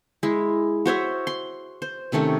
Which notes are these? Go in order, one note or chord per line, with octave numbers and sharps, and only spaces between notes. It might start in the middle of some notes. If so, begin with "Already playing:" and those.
G#3 E4
F#4 C5 C#5 E5
C6
C5
C3 D#3 A3 C#4